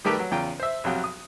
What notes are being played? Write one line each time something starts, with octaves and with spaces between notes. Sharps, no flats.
D#3 G3 A3 G4 A#4 B4
F#3
E2 C#3 F4 G5 A#5
C5 E5
B1 F2 C3 F#3 F5 G5
D#6